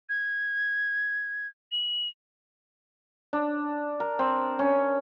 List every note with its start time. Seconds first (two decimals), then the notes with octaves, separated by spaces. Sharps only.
0.09 G#6
1.72 F#7
3.33 D4
4.00 A#4
4.19 C4
4.59 C#4